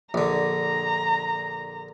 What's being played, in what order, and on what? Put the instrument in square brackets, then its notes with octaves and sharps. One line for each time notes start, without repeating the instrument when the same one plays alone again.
[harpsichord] A#1 D3 [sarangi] A#5